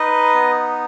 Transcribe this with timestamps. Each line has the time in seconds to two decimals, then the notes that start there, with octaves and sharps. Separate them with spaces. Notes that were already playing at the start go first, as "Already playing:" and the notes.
Already playing: D#4 B4 D#5
0.34 B3